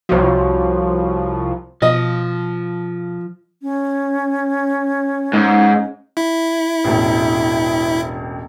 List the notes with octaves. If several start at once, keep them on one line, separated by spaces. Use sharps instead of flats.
C2 F3 F#4 C#5
B2 F3 D#5
C#4
G#2
E4
E1 A1